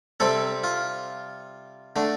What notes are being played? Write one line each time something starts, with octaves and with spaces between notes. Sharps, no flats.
C3 G3 C4 A4
F4
D3 A3 D4